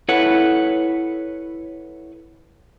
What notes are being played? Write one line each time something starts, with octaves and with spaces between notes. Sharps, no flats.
E4 A4 B4 C#5 F#5